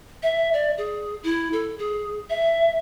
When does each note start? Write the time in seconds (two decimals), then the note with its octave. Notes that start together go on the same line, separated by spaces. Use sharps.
0.23 E5
0.54 D5
0.78 G#4
1.23 E4
1.53 A4
1.79 G#4
2.30 E5